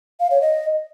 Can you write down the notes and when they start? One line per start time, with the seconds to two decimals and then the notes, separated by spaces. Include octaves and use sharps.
0.20 F5
0.31 C#5
0.41 D#5